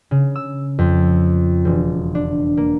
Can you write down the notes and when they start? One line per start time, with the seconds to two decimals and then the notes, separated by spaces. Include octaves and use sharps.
0.11 C#3
0.36 E6
0.79 F2
1.65 E1
2.15 D4
2.57 A#3